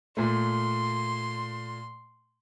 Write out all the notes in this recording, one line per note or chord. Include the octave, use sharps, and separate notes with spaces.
A#2 A3 C6